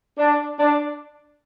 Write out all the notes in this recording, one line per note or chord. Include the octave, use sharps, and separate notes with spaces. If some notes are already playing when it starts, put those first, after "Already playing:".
D4
D4